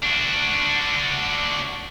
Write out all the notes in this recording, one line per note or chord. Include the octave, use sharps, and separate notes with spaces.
D4 F#4